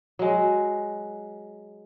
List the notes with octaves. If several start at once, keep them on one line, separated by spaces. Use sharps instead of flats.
F#3 G#3